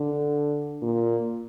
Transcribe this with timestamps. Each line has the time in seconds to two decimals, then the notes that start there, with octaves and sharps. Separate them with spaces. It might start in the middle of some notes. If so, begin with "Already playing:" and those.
Already playing: D3
0.82 A#2